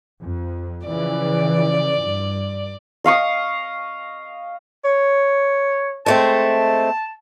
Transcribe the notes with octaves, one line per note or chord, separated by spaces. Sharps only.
F2
C#3 E3 F3 D5
G2
D#5 F5 C#6 D#6
C#5
G#3 A3 C4 A5